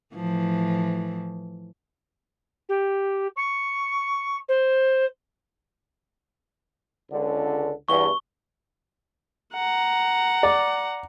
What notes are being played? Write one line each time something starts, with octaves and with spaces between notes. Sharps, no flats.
A2 E3 F3
G4
C#6
C5
C#2 D3
E2 G2 C#6 G7
F#5 A#5
D5